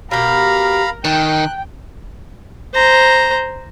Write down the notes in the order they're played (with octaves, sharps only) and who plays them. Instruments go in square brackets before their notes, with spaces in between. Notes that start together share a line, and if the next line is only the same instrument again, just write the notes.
[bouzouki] B2 G4 [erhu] A#4 [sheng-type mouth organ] F5 A#5 B5
[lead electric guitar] D#3 [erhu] G5 [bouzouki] A5 [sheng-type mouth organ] F#6
[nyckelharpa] C5 A#5